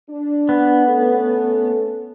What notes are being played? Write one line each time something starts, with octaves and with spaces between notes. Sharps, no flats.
D4
B3
A3 C#4 A4